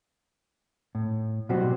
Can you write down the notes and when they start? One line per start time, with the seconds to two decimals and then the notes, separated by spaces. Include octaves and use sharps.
0.95 A2
1.49 B2 F#3 G3 C4 F#4 G4